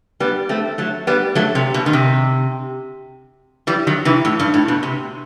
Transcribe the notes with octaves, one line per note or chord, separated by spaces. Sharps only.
G3 B3
A3 C4
F#3 A3
G3 B3
F#3 A3
C3
B2
D#3
C3
E3 G3
D#3 F#3
C3 E3
A2
G2
A2
B2
C3